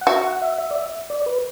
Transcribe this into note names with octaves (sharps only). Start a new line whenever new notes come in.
F#5
F#4 E5
F#5
E5
E5
D5
E5
D5
B4